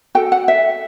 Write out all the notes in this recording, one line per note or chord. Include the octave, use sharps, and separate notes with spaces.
F#4 A4 G5
F#5
E5